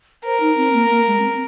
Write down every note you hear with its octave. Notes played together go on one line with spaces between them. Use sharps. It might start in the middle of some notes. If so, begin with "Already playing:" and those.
A#4 C5
D#4
C4
A#3
A#3
G#3
C#4
C4